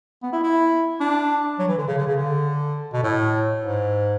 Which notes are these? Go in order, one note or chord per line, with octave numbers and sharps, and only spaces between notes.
B3
E4
E4
D4
F#3
E3
D3
C#3
D3
C#3
D3
B2
A2
G#2